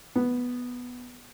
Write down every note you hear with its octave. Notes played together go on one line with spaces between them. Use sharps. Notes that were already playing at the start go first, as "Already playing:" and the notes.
B3